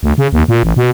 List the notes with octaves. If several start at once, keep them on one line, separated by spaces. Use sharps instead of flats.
D2
C#3
D#2
A#2
A1
B2